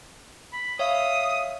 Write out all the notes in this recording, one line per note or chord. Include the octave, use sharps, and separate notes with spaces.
B5
C#5 E5 F5 D#6